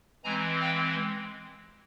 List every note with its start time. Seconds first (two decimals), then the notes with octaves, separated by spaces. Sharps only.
0.24 E3 G#3 C4 G#5 A#5
0.60 F5 G5